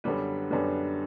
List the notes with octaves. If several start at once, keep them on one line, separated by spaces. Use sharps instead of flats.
F#2 D3 G3 B3 B4
F#2 D3 G3 B3